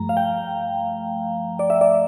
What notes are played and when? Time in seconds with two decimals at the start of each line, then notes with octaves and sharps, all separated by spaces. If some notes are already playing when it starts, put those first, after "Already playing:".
Already playing: G2 F3 A3 A#5
0.09 F5
0.17 G5
1.59 D5
1.70 E5
1.81 D5